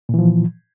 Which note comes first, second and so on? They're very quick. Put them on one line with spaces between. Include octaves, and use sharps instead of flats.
A#2 E3 F3